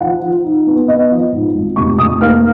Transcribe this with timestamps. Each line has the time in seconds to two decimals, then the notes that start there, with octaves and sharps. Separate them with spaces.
0.01 F3 F#5
0.22 F3
0.44 D#4
0.67 B3
0.88 B3 D#5
1.11 F3
1.32 G#2
1.54 G#1
1.76 F1 C#6
1.98 F1 D#6
2.21 A#3 F6